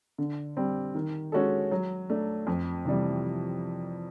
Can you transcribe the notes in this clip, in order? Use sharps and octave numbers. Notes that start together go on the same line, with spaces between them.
D3
G3 C4
D#3
G#3 C#4 F#4 A4
F#3
A3 D4
F2
C3 E3 G3